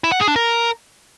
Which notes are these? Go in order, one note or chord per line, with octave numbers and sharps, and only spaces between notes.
E4
F#5
G#4
D4
A#4